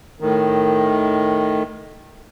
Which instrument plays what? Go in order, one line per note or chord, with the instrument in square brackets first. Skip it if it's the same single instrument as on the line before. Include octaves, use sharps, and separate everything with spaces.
[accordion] A2 D#3